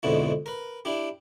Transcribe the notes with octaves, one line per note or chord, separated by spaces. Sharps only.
F2 G#2 B2 D3 E4
A#4 B4
D4 E4 G4